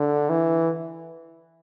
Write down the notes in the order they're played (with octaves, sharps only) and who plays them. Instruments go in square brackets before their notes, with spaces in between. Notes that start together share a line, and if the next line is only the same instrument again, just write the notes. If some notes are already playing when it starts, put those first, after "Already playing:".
Already playing: [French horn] D3
E3